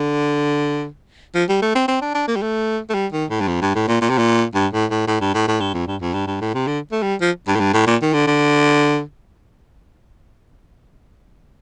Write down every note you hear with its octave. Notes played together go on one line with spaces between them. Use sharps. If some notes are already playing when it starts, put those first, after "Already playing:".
Already playing: D3
F3
G3
A3
C4
C4
D4
D4
A#3
G3
A3
A3
G3
D#3
A2
G2
F2
G2
A2
A#2
A#2
C3
A#2
G2
A2
A2
A2
G2
A2
A2
G2
F2
G2
F2
G2
G2
A2
C3
D3
A3
G3
F3
G2
A2
G2
A2
A#2
D#3
D3
D3